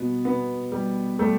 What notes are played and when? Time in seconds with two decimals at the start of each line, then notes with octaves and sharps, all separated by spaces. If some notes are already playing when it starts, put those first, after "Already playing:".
Already playing: B2 G3 B3
0.24 B2 B3
0.72 G3
1.19 G3 A3